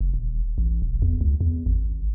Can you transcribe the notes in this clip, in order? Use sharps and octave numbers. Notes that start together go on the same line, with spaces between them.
F1
D#1
A1
D#1
E2
C#2
E2
G#1